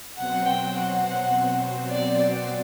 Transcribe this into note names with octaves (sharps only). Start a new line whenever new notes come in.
B2 F#3 C4 F#4 C5 F#5
G5
F#5
F#5
D5
D5